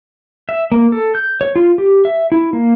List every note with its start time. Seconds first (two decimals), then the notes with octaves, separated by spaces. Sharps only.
0.49 E5
0.72 A#3
0.92 A4
1.15 G6
1.41 C#5
1.56 F4
1.78 G4
2.05 E5
2.32 E4
2.53 A#3